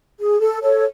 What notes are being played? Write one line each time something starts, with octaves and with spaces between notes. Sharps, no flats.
G#4
A4
A4 C#5